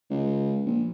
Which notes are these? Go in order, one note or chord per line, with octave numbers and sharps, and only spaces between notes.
C#2
A#1